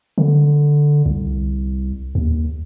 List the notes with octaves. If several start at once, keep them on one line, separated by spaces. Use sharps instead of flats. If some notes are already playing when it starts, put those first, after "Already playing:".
D3
C2
D#2